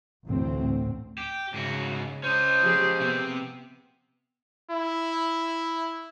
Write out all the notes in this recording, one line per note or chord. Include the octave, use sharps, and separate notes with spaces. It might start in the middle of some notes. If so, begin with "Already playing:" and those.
A1 D2 A2 C4
G4
G#2 C#3 F#4
C#4 C5 D#5
F3 G4 G#4
C3 B3 C4
E4